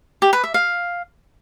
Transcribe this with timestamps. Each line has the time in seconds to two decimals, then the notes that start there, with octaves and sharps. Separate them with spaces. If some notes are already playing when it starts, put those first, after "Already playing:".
0.22 G4
0.33 B4
0.44 E5
0.54 F5